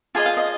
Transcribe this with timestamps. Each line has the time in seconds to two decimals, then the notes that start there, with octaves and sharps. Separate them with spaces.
0.15 F4 G#4 C5 D#5 G#5
0.26 F5
0.37 D#5